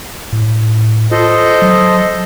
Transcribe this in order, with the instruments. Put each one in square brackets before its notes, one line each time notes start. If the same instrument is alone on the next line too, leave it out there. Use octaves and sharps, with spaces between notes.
[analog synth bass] A2
[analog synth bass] F4 [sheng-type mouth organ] A4 C5 D#5
[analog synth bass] F#3